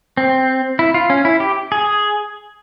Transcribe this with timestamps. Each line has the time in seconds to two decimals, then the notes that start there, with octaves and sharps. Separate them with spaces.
0.17 C4
0.79 E4
0.94 F4
1.10 C#4
1.25 E4
1.40 G4
1.72 G#4